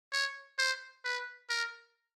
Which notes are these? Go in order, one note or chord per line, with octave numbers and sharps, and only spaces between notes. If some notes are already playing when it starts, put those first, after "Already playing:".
C#5
C5
B4
A#4